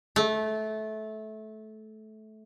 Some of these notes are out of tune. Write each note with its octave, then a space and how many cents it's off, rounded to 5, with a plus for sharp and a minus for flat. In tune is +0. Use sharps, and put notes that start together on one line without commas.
A3 -20